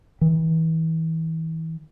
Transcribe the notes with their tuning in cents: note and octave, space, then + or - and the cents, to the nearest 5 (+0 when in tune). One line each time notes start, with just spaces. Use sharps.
E3 -35